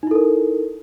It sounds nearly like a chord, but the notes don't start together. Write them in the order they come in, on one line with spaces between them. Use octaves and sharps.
D#4 E4 A4 A#4